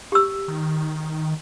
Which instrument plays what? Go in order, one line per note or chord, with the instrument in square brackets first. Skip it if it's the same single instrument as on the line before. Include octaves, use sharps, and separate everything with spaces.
[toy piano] G4 E6
[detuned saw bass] D#3